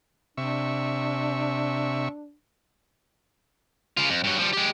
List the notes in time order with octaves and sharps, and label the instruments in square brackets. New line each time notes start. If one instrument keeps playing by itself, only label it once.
[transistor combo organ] C3 E5 C#6 [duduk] D4
[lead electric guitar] C#3 F4
F2
G2 F#3
F3 G3
G#3 G4